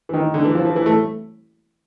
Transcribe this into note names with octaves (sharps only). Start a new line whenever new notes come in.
E3
D#3
D3
E3
F3
E3
E3
A3